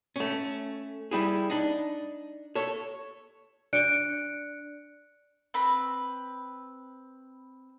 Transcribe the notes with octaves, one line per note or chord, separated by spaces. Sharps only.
A3 C#4
G3 E4 G#4
D4 D#4
A4 C#5
D4 D5 F#6 C#7 D7
C4 B4 B5